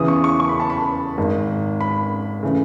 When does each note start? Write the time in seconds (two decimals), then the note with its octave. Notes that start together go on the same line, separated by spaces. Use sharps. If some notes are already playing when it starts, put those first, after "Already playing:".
Already playing: E2 C#3 E3 D#6
0.08 C#6
0.24 C#6
0.40 C#6
0.49 B5
0.60 A5
0.70 B5
1.18 G#1 G#2 D#3
1.81 B5
2.43 C#3 E3 A3